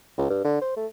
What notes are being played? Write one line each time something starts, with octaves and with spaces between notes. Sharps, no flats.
C#2
G2
D3
C5
A3